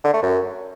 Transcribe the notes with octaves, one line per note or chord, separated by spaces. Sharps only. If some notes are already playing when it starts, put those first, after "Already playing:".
D3
A3
F#2